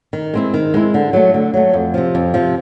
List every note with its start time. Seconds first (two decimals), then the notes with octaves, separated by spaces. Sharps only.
0.13 D#3
0.34 G#3 C4 E4
0.54 D#3
0.74 G#3 C4 E4
0.94 D3
1.13 F#3 A3
1.34 D3
1.54 F#3 A3
1.73 F2
1.94 C3 F3
2.15 F2
2.34 C3 F3